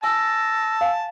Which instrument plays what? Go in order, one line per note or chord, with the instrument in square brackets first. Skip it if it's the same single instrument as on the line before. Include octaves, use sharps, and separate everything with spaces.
[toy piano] G#5 [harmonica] A5 [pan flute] E6 [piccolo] A#6
[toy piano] F5 G#5